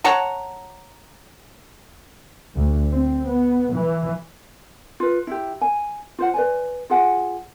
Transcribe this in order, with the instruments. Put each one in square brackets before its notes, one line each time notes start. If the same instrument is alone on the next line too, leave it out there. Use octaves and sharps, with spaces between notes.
[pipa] C#5 F#5 A5 A#5
[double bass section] D2
C4
B3
E3
[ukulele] F4 B4
E4 G4
G#5
F4 C5 F#5
B4 D5 G#5
F4 G#4 F#5 G#5